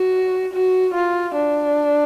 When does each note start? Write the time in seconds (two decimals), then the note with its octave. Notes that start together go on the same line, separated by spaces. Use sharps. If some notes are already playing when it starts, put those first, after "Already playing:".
Already playing: F#4
0.54 F#4
0.94 F4
1.35 D4